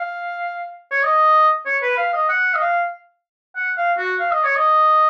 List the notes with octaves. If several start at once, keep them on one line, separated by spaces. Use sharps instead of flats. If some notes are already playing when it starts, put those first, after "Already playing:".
Already playing: F5
C#5
D#5
C#5
B4
F5
D#5
F#5
D#5
F5
F#5
F5
F#4
F5
D#5
C#5
D#5